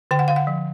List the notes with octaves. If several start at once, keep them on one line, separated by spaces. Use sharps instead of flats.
D3 G5
F#5
D3 F5
F#5
F3